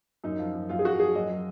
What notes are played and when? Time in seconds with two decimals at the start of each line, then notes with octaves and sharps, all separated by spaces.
0.24 F#2 D#4
0.39 F3
0.55 F#2
0.69 F#2 F4
0.79 G#4
0.84 F#2 F#4
1.00 F3 G#4
1.15 F#2 D#5
1.30 F#3